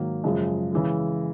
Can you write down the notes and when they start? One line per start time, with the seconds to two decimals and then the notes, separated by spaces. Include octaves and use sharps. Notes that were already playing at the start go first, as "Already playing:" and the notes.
Already playing: G#2 D#3 F#3 A#3
0.24 F#2 C#3 F3 G#3 C#4
0.73 C#3 E3 G#3